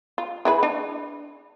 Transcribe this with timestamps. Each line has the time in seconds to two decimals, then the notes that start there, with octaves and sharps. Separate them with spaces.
0.18 F4
0.45 E4 G#4 B4
0.63 D4